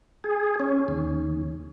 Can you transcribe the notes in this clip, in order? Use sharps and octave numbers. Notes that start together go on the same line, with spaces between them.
G#4
C#4
D#2